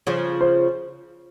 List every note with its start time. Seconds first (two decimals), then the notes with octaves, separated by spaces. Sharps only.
0.07 C#3 F3
0.41 C5